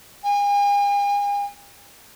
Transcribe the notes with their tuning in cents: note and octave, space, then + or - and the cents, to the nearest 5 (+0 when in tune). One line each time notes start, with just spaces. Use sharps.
G#5 -40